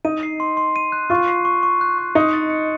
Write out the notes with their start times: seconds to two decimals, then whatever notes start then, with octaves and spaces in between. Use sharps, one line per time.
0.05 D#4 D#7
0.23 C7
0.40 C6
0.57 C6
0.76 D#7
0.92 F#6
1.10 F4 C#6
1.28 C7
1.45 C#6
1.63 C#6
1.81 F#6
1.98 C#6
2.15 D#4 C#7
2.33 A6
2.50 C#7